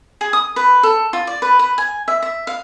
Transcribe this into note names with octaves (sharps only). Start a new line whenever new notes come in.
G#4
D#6
B4
A4
F4
D5
B4
B4
G#5
E5
E5
F5